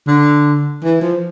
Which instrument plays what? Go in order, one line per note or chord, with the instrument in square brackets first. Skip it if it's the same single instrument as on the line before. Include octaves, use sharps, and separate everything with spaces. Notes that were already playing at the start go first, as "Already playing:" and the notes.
[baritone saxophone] D3
E3
F3